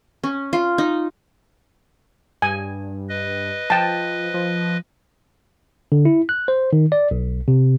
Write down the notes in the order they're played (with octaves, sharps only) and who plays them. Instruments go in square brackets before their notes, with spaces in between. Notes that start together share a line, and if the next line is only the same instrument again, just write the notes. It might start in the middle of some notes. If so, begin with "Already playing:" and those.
[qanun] C#4
F4
D#4
[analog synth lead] G2 [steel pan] G#5
[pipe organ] B4 D#5
[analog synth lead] F3 [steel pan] G5 A5
[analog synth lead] F3
[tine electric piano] D3
E4
F#6
C5
D#3
D5
B1
C3